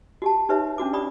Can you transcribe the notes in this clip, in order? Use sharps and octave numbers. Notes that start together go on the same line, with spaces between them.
F#4 G4 A5
D#4 G4 B4 C#5 E5
C#4 D4 F#4 D6
G4 D5 B5 D#6